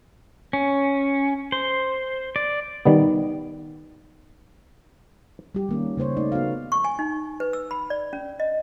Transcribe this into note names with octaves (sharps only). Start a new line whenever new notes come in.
C#4
C5
D5
D#3 G3 B3
G3 G4
D#3 A#3 C#4
C#3 A#3 C5 C#5
A3 D#4 D5
B3 F#4 F5
C#6
G#5
D#4
B4
E6
B5
D5
C#4
D#5